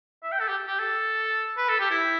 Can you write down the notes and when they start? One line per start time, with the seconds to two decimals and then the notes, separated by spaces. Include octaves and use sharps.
0.23 E5
0.32 G5
0.40 A4
0.48 G4
0.67 G4
0.79 A4
1.58 B4
1.69 A4
1.80 G4
1.91 E4